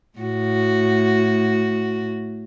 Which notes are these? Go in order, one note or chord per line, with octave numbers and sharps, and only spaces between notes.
A2 F#4